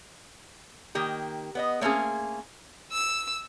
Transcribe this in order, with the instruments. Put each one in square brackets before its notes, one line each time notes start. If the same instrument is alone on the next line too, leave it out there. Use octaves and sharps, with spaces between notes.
[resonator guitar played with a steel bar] D#3 A#3 G4
B3 D5 D#5
A3 A#3 C4 C#4 G#4
[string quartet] E6